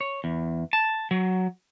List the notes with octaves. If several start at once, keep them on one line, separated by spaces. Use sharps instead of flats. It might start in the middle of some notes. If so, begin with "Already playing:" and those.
C#5
E2
A5
F#3